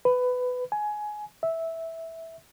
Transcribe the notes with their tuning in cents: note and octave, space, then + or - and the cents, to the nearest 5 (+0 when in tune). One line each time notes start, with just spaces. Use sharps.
B4 +15
G#5 +15
E5 -10